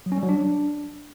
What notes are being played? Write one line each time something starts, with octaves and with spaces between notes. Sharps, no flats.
F#3
C#4
G3
F#3
D4